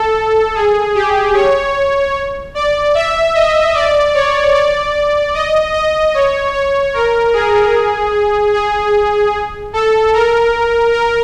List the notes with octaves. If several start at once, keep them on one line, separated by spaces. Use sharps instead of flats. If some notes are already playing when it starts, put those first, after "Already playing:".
Already playing: A4
G#4
G4
C#5
D5
E5
D#5
D5
C#5
D5
D#5
D#5
C#5
C#5
A#4
G#4
G#4
A4
A#4
A#4